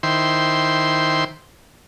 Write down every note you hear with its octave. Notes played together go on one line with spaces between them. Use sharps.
D#3 E4 C5 G5 C6